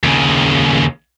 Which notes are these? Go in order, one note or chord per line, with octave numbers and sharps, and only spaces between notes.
D#2 C#3